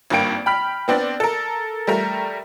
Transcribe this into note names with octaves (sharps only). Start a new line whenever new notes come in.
G#1 G2 A#3 G5 D7
G5 B5 F6 B6
B3 C4 D4 D5
A4 A#4
G3 A3 A#4 A#5